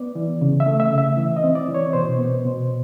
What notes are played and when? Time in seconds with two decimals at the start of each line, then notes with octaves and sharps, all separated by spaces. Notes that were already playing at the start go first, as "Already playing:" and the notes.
Already playing: B3 D5
0.15 E3
0.41 C#3
0.60 E5
0.66 A3
0.80 E5
0.92 C#3
0.98 E5
1.17 E3
1.37 D#5
1.43 C4
1.55 D5
1.68 E3
1.75 C#5
1.93 B2 C5
2.19 B3
2.45 B2